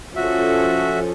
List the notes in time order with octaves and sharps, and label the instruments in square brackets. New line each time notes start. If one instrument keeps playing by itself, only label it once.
[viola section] F3 C#4 A4 [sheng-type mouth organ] F#4 E5